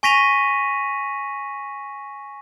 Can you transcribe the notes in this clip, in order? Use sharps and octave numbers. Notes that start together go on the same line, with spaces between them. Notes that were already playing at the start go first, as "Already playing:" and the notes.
G#5 C#6 A#6 B6 D#7 F7